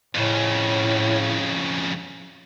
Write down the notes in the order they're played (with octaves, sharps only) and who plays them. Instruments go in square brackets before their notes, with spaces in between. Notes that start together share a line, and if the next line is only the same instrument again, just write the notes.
[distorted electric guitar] F2 C#3 [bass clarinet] A2